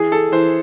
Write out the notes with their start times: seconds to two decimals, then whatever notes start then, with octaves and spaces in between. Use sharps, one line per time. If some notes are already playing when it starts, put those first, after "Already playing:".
Already playing: E3 G#4
0.12 A4
0.32 E3 C5